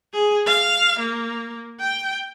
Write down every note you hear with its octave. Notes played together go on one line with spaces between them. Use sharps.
G#4
F5
A#3
G5